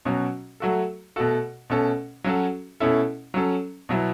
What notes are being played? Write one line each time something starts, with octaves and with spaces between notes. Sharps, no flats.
B2 F#3 C#4 F#4
F#3 A3 F#4 A4
B2 A3 F#4 A4
B2 A3 C#4 A4
F#3 C#4 F#4 A4
B2 A3 C#4 E4 A4
F#3 C#4 A4
B2 F#3 B3 E4